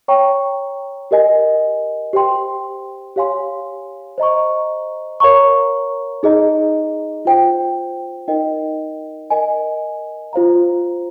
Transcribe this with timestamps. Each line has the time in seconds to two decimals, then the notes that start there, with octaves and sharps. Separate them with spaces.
0.08 C#5 G5 A#5 C#6
1.11 G4 A#4 D#5 G#5
2.13 G4 C5 G5 C6
3.16 G4 C#5 F5 G#5 C6
4.18 C5 D#5 A#5 C#6
5.20 A#4 C#5 F5 A#5 C#6
6.23 D#4 G#4 D#5 A#5
7.25 F4 C5 G5
8.28 D#4 A#4 D#5 G5
9.30 A#4 D#5 G#5
10.33 F4 C5 F5 A#5